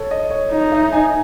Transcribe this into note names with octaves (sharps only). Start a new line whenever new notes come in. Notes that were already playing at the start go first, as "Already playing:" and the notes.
Already playing: A4 C#5
D#5
C#5
D#4 D#5
E5
G#5